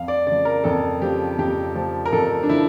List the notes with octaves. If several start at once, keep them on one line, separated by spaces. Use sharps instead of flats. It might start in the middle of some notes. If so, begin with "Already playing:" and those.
Already playing: F2 F5
D5
C#3 F3 D5
A#4
F2 A4
C#3 F3 G4
F2 G4
C#3 F3
A#4
F2 A4
D4
C#3 F3 E4